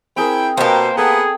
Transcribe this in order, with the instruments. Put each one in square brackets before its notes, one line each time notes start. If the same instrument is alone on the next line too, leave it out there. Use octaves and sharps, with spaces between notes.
[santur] C4 G#4 A#4 [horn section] E4 G5
[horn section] B2 [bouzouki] A#3 G4 [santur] A#4 A5 [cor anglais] C5
[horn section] B3 [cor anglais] G#4 [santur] A4 G5